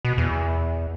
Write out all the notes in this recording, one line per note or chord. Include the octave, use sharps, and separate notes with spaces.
B2
E2